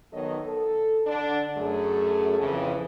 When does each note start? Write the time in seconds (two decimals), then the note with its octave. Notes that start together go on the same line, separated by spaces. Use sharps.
0.12 D#3 F#3 B3 A4 C#5 D#5
0.45 A4
1.06 D3 D4
1.55 F#2 A3 G#4
2.40 F2 C#3 E3